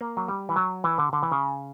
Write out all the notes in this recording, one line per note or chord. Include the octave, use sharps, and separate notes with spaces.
A#3
F#3
G3
E3
F#3
E3
D3
D3
E3
C#3